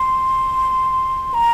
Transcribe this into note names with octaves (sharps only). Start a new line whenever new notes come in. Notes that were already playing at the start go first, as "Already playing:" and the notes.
Already playing: C6
A#5